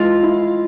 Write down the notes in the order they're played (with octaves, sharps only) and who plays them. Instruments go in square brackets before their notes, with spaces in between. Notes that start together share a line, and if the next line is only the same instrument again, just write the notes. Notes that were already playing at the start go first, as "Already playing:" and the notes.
Already playing: [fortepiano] E3 G#3 [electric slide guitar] F4
[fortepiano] E4